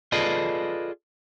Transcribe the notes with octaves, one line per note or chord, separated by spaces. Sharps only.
F4 G#4 A4 B4 D5 D#5